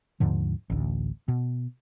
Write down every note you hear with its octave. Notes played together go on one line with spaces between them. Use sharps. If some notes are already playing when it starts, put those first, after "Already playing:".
D#2 G#2 D3 F3
A1 D2
B2